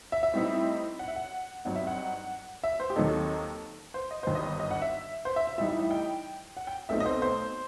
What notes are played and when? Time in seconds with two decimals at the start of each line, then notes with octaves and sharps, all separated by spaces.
0.12 E5
0.23 E5
0.34 A2 G3 C4 D#4
0.99 F#5
1.08 E5
1.16 F#5
1.65 G2 F#3 C4 D#4 F#5
1.76 E5
1.87 F#5
2.64 E5
2.80 C5
2.90 G4
2.96 D#2 D#3 F#3 C4 D#4 A4
3.94 C5
4.11 D#5
4.23 G1 G2 D#3 C5
4.35 D#5
4.60 D#5
4.71 F#5
4.82 E5
5.25 C5
5.36 E5
5.47 E5
5.58 A2 E3 G3 D#4 E5
5.69 E5
5.80 E5
5.91 G5
6.57 F#5
6.67 G5
6.89 B1 B2 A3 C4 D#4 E5
7.00 D#5
7.06 C5
7.22 C5